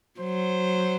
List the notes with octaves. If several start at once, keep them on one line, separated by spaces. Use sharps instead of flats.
F#3 C5